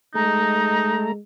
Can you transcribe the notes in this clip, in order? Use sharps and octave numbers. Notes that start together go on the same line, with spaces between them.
G#3 A3 D#4 A#5